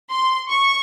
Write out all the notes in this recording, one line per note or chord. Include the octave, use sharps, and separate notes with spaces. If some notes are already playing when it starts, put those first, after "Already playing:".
C6
C#6